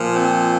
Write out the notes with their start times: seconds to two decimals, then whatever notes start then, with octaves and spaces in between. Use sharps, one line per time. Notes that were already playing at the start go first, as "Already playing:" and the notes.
Already playing: A#2 F3
0.13 C4